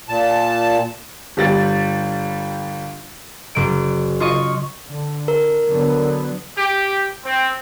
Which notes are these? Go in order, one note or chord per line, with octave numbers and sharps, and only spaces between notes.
A#2 A5
G1 G3 A6
F#1 D7
F4 D#5 C#6 D#7
D3
A#4
D3 F#3 B3
G4
C4